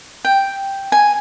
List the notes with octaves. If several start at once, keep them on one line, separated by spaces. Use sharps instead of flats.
G5
G#5